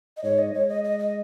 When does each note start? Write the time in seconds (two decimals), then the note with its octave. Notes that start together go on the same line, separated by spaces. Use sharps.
0.17 D#5
0.23 G#2 C#5
0.38 D#5
0.53 G#3 C#5
0.69 D#5
0.84 D#5
0.99 D#5